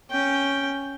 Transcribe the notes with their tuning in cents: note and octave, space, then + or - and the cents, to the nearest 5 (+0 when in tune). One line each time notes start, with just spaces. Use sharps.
C#4 +0 G5 +0